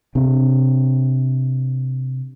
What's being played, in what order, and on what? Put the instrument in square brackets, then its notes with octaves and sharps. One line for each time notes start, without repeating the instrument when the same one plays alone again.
[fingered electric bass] C3 C4 D4